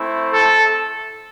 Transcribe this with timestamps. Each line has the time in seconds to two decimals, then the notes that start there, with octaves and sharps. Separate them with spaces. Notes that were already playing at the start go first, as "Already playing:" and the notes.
Already playing: A3 C4 E4
0.32 A4